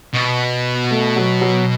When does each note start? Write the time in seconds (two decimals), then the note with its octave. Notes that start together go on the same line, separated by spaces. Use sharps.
0.14 B2
0.91 A3
1.16 F#3
1.41 F#3